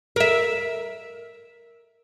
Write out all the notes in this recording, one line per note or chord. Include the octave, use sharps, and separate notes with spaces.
A#4 E5